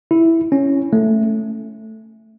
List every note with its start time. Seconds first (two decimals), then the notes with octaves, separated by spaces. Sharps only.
0.11 E4
0.52 C#4
0.93 A3